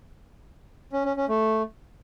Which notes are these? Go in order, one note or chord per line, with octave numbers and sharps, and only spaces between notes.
C#4
C#4
C#4
A3